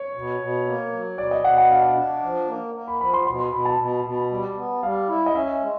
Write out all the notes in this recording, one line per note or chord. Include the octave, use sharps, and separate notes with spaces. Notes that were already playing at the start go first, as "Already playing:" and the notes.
Already playing: C#5
B2
B2
A#3
F#3
B2 D5
D#5
B2 F#5
F#5
D4 F5
D4
F3
A#3
A#3
B5
F3 B5
C6
B2 C6
C6
B2 B5
A5
B2
B2
G3
B3
G3 F5
E4
D#5
C#4 E5
G#3